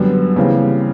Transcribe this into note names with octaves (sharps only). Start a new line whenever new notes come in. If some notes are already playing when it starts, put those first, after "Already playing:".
Already playing: F#2 D3 G3 B3
D#2 C#3 E3 G3 C4